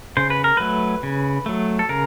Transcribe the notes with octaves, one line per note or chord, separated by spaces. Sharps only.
C#3 C5
B4
A#4
F#3 A3 B4
C#3
F#3 A3
A4
C#3 A#4